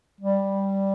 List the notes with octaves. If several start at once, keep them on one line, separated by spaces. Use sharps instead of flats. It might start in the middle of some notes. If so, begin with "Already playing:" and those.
G3